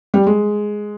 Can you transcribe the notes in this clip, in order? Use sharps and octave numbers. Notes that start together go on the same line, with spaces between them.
G3
G#3